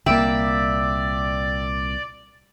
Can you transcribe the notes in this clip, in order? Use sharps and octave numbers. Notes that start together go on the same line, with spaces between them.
C2 A#2 A#3 D5 E5 G5